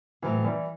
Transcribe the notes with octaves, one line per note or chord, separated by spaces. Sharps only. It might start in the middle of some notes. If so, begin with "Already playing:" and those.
A2 E3 F#3 C4
E3 G3